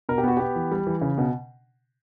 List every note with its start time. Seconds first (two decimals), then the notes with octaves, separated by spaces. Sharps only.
0.09 B2 A#4
0.18 G4
0.23 B3 F#4
0.37 B3 G4
0.56 E3
0.71 G3
0.87 E3
1.01 C#3
1.18 B2